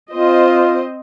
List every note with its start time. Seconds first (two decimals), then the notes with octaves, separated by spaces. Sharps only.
0.11 C4 F4 C5 D#5